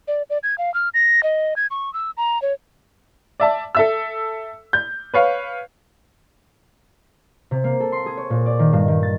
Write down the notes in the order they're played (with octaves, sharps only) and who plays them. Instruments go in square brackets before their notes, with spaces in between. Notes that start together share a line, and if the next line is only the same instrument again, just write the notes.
[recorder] D5
D5
G#6
F5
F6
A#6
D#5
G#6
C#6
E6
A#5
C#5
[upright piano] D5 E5 A5
A4 E5 E6
G6
B4 C#5 F5
[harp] C3
A#3
A4
C6
G#4
C#5
A#2
D5
D#3
G2
D#3
A6